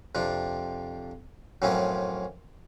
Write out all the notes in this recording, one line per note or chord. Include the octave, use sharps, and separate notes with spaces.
F2 C3 D4
F#2 A2 E3 F3 C4 C#4